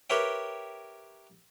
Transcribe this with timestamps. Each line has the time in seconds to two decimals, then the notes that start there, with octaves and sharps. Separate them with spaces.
0.10 G4 A#4 B4 C#5 E5 G5